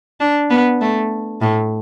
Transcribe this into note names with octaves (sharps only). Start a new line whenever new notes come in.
D4
B3
A3
A2